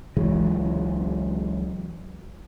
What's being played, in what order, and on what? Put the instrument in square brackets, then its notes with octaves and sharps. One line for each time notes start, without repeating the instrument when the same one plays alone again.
[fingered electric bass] C#2 E3 F#3 G#3